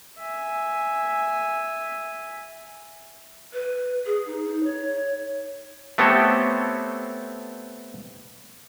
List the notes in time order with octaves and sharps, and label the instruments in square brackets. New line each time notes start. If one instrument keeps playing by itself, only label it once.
[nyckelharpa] E5 G#5
[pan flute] B4
G#4
D#4
D#4
C#5
[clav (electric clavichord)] A3 B3 C4 G4 A4 C#5